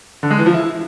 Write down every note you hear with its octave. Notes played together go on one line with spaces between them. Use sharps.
D3
G#3
E3
F3
E4